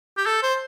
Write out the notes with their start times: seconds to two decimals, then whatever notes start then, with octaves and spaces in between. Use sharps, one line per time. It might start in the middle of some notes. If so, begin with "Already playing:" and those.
0.17 G4
0.26 A4
0.43 C5